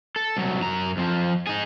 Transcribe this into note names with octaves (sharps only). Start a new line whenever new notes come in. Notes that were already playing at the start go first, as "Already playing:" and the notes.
A4
C2 F#3
F#2 A#5
F2 F3
D#4 G#4